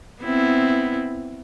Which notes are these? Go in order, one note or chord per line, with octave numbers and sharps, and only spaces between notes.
B3 C4 E4